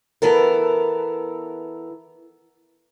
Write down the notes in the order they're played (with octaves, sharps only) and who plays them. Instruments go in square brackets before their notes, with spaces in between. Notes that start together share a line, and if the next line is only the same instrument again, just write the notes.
[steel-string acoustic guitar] E3 B3 A4 A#4